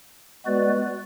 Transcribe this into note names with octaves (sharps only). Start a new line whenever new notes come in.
G#3 B3 F#4 B4 D5